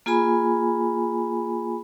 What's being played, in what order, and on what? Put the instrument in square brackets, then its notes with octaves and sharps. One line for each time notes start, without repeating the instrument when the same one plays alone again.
[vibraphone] A#3 F4 G#4 G#5 B5